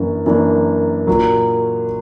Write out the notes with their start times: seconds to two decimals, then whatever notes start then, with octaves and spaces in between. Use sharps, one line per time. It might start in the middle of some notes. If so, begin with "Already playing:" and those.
Already playing: F#2 E3 A#3 D4
0.26 F#2 E3 A#3 D4
1.07 A#2 F#3 A#3